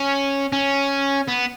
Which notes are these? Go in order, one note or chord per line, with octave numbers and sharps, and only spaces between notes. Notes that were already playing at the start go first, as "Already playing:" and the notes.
Already playing: C#4
C#4
B3